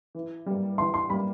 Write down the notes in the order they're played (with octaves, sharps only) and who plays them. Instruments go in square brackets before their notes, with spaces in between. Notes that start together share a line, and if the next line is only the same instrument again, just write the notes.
[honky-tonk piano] E3
G3 A#3
[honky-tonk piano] E3 [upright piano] C6
[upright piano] C6
[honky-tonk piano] G3 A#3 [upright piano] B5